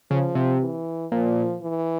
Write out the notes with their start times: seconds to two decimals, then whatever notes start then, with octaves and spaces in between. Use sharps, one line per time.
0.11 C#3 F3
0.35 C3
0.61 E3
1.12 A#2 F3
1.62 E3